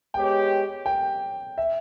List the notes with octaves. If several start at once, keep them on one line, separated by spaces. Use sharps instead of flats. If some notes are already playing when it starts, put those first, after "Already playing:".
G#3 B3 G4 C#5 G5
G5
E5